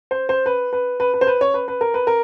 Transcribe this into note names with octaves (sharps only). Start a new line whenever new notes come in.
C5
C5
B4
B4
B4
B4
C5
B4
C#5
B4
B4
A#4
B4
A#4